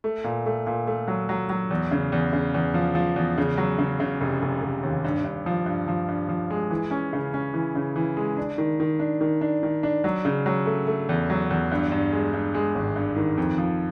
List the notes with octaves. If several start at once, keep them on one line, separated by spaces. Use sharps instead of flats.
A3
A#2
A3
A#2
A3
F#3
F#3
F#3
E2
C#3
E2
C#3
E2
F3
F3
E2
C#3
F#3
C#3
C#3
F1
F1
F1
D#2
G2
G2
F3
G2
F3
G2
F3
G#3
E3
C#4
C#3
C#4
E3
C#3
E3
G#3
D4
D#3
D#3
D4
D#3
D4
D#3
D4
F#3
C#3
F#3
A3
A3
E2
F#3
E2
G2
G2
G#3
G2
G#3
G#1
G2
D#3
F2
F3